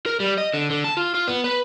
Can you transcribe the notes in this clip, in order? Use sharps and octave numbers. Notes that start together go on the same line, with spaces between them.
A#4
G3
D#5
D3
D3
A5
F4
F4
B3
B4